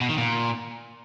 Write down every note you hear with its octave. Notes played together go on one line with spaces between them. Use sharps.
B2
D#3
A#2